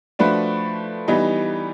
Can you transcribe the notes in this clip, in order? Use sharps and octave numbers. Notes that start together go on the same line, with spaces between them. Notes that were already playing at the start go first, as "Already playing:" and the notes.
F3 A3 D4 F#4 B4
E3 G3 B3 D#4